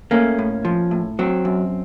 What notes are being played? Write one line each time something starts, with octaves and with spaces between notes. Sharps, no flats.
A3 A#3 C#4
A2
F3
A2
F#3 C4
F#2